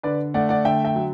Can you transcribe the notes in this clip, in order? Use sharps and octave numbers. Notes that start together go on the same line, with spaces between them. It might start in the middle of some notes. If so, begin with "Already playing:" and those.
D3 B4 D5
A3 D5 F#5
D5 F#5
D3 E5 G5
E5 G5
F#3